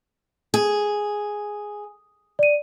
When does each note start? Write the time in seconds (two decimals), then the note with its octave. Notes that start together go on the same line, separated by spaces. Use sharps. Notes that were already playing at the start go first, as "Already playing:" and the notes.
0.54 G#4
2.39 D5 D#7